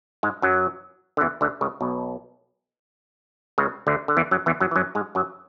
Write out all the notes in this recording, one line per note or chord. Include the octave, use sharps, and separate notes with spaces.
G#2 G#3
F#2 F#3
D3
E2 E3
D2 D3
C#2 C#3
B1 B2
C#2 C#3
D2 D3
D3
E2 E3
F#2 F#3
E2 E3
F#2 F#3
E3
F#2 F#3
G#2 G#3
F#2 F#3